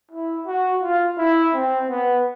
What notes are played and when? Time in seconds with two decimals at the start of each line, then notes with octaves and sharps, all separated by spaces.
0.11 E4
0.47 F#4
0.82 F4
1.18 E4
1.54 C4
1.89 B3